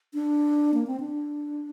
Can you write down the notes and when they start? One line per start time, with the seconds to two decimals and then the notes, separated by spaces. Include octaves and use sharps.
0.14 D4
0.74 A#3
0.87 C4
1.00 D4